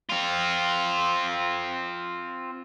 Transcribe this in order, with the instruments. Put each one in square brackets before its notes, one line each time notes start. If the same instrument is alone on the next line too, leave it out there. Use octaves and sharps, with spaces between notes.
[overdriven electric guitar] C4 F4